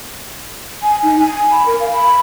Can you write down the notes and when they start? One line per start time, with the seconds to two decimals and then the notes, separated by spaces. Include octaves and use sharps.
0.82 G#5
1.03 D#4
1.19 G#5
1.51 B5
1.66 A#4
1.80 F5
1.91 B5